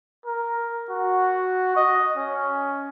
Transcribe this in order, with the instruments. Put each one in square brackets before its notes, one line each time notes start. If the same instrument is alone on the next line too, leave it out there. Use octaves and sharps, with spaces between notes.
[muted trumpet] A#4
F#4
D#5
C#4